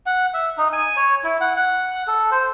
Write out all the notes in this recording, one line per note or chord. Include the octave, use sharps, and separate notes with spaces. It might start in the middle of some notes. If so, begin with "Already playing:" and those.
F#5
E5
D#4
G#5
C#5
E4
F#5
F#5
A4
C5